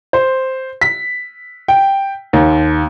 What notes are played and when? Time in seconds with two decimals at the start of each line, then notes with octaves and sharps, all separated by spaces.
0.13 C5
0.81 B6
1.68 G5
2.33 D#2